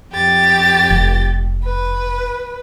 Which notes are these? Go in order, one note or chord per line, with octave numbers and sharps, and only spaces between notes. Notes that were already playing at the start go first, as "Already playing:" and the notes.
F2 G4 A6
F1
B4